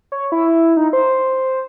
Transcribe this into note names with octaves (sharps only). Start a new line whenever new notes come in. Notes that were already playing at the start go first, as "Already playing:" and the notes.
C#5
E4
D#4
C5